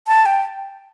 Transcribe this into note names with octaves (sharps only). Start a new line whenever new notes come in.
A5
G5